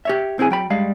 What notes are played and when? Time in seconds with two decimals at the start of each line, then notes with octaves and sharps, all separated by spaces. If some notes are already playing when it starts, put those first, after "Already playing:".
0.05 G4 C#5 E5
0.38 B1 C4 E4 G#4 G#5
0.50 F#3 G5 B5
0.70 G2 G3 G#3 F5